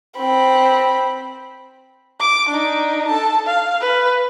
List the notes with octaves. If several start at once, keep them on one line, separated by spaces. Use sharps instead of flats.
C4 B5
D6
D4 D#4
A4 A5
F5
B4